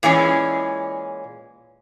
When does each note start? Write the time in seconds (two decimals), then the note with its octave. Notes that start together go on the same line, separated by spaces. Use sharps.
0.03 A#2 E3 G#3 C#4